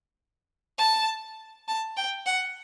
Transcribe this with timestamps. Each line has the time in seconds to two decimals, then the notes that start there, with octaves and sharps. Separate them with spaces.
0.78 A5
1.68 A5
1.97 G5
2.26 F#5